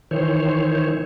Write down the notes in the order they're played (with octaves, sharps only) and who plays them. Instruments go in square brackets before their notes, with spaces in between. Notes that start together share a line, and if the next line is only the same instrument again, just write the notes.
[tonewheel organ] D#3 E3 C5 C#5